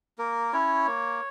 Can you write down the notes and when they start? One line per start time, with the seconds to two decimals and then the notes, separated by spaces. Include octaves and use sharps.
0.18 A#3 A#4
0.53 C#4 E4 C#5
0.87 A#3